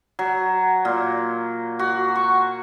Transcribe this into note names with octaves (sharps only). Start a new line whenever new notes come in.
F#3
A#2
F#4
C#6